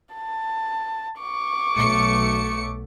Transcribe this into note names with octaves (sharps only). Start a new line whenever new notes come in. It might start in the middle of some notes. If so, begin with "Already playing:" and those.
A5
C#6 D6
B1 A3 C#7